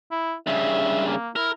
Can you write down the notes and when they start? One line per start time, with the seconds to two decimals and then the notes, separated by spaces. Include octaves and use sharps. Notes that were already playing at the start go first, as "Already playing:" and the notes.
0.11 E4
0.47 G2 C#3 E5
1.07 A#3
1.36 E4 A#4